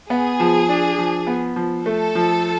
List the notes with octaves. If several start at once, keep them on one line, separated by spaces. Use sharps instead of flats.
B3 G#4
F3
D4
F3
B3
F3
A3 A4
F3